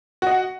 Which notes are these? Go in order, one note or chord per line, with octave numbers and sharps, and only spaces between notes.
F#4 D#5 F#5